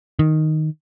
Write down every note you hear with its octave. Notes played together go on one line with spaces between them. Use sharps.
D#3